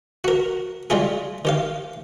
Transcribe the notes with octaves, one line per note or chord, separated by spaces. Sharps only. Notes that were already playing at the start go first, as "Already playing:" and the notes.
F#4 A#4
G3 G#3 F4 G#4
D#3 G4 F5